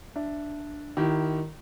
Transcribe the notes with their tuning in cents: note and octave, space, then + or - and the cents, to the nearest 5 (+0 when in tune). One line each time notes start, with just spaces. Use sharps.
D4 +0 E5 +5
D#3 +0 E4 +0 G4 -35